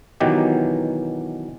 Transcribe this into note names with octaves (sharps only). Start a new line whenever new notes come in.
B2 D#3 E3 F#3 G4